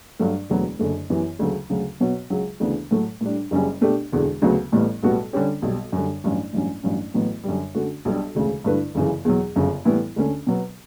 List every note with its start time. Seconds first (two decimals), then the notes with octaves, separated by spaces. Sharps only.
0.19 G2 F#3 A3
0.50 E1 D2 D3 F#3 B3
0.79 F#1 F#2 D3 A3
1.10 F#2 E3 B3 E4 G4
1.39 D2 C#3 F#3 A3
1.70 D2 C#3 F#3
2.00 B2 F#3 B3 F#4 C#5
2.30 C#2 C#3 F#3
2.60 D2 C#3 E3 B3 D4
2.91 A2 F#3 A3
3.21 A2 G3 D4
3.51 F#1 F#2 C#3 G3 C#4
3.81 B2 A3 D4 G4
4.12 E1 E2 D3
4.42 D2 C#3 F#3 B3 F#4
4.72 A1 A2 G3 B3
5.03 B1 A2 G3 B3 F#4
5.33 D3 G3 C#4 G4 C#5
5.62 B1 B2 G3
5.92 F#2 D3 G3
6.24 A1 G2 F#3 C#4
6.53 A1 G2 F#3 C#4
6.83 A1 G2 F#3 C#4
7.14 A1 A2 F#3 B3 F#4
7.44 F#2 D3 G3
7.75 D3 A3 C#4 F#4
8.05 B1 B2 G3 D4 G4
8.35 E1 D2 C#3
8.64 G2 D3 A3 E4 B4
8.95 G1 F#2 C#3 E3
9.25 E2 B2 F#3
9.56 G1 F#2 C#3
9.85 A2 E3 G3 B3 E4
10.16 D2 D3 A3 C#4
10.47 B2 F#3 B3